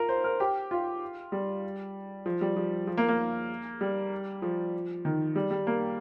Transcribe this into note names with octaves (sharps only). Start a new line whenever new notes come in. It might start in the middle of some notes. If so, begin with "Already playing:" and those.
Already playing: F4 A#4
C5
A#4
G4
F4
G3
F3
G3
F3
F3
A#3
A#3
G3
F3
D#3
G3
G3
A#3